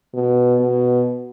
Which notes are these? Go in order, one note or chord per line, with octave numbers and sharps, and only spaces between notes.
B2
B2